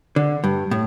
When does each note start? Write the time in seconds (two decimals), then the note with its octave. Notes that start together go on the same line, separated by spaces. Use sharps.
0.16 D3
0.44 G2
0.71 A2